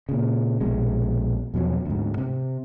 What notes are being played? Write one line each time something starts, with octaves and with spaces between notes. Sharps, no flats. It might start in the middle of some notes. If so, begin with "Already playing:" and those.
A#2 C#3
A#1 B2 G#3
E2 B2 F3 F#3
D2 G#2
C3